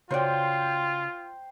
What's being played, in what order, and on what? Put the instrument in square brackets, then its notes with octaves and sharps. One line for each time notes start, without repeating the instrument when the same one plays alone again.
[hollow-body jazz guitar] C#3 F#4 D5 [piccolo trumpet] F4 [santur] C5 G5